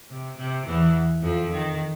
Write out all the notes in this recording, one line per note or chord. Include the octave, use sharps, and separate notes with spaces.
C3
C3
E2 E3
F2 F3
D#3